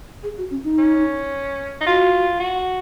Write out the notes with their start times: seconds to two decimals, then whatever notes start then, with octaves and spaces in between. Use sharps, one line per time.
0.23 G#4
0.38 F#4
0.51 C#4
0.64 D#4
0.78 C#4
1.81 D#4
1.86 F4 F#4
2.40 F#4